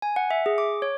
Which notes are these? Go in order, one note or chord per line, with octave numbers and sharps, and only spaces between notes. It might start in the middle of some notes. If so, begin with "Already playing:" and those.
G#5
F#5
E5
G#4
D6
C#5